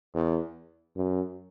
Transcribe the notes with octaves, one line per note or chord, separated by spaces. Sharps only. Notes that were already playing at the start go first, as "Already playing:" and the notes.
E2
F#2